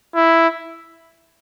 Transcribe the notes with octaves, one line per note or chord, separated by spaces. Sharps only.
E4